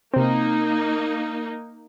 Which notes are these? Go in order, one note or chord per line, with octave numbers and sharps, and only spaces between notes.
C3 A#3 C4 D#4